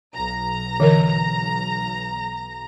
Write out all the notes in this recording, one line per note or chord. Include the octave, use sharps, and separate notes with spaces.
B1 A#5
D3 E3 A#4